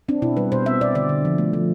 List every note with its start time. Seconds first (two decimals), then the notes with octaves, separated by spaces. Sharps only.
0.08 C4 D4
0.22 B2 E4
0.37 G3 B4
0.52 B2 C5
0.66 C4 E5
0.81 B2 D5
0.95 D3 D5
1.09 D3
1.25 F3
1.38 A3
1.53 F3